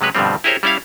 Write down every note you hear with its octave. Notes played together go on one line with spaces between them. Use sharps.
C3 F#3 G#3 B4 C#5
G2 B2 D3 F3 G3 C4
E4 G4 G#4 A#4 C5 C#5
G3 C#4 E4 C#5 F5